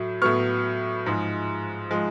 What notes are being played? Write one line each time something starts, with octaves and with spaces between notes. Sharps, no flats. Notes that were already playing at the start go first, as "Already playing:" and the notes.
Already playing: A2 F#3
A2 F#3 B3 C#6 F6
G#2 F3 G#3
F3 G#3